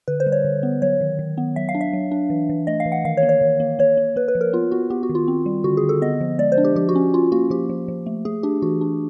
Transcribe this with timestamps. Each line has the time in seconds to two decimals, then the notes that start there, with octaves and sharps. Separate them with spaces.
0.08 D3 B4
0.20 C5
0.26 G3
0.32 C#5
0.45 D3
0.63 B3
0.82 F#3 C#5
1.01 D#3
1.19 D#3
1.38 B3
1.56 F#3 E5
1.69 F5
1.75 D4
1.81 E5
1.93 F#3
2.12 D4
2.30 E3
2.49 E3
2.67 A3 D#5
2.80 F5
2.86 E3
2.92 F#5
3.05 D#3 F5
3.17 C#5
3.23 A#3
3.29 C#5
3.41 D#3
3.60 A#3
3.79 A#3 C#5
3.97 A#3
4.16 A#3 B4
4.28 B4
4.35 F3
4.41 A#4
4.53 B3 F4
4.71 B3 F#4
4.90 B3 G4
5.03 F#4
5.09 D#3
5.15 F4
5.28 C4
5.46 G3
5.64 D3 F#4
5.77 G#4
5.84 D3
5.89 A4
6.02 B3 D#5
6.21 F3
6.39 G#3 D5
6.52 C5
6.58 D4
6.65 G4
6.76 F3 G4
6.89 F#4
6.95 C#4
7.14 C#4 F4
7.32 A#3 F#4
7.50 F3 G4
7.69 F3
7.88 F3
8.06 A3
8.25 A3 G#4
8.43 D4 G4
8.62 E3 F#4
8.81 D4